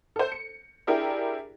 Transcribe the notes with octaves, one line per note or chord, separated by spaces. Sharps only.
A4 C5
C#7
D4 E4 G4 G#4 A#4